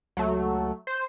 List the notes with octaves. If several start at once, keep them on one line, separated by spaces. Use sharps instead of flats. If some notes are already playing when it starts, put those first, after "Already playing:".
C#2 F#3 A3
C5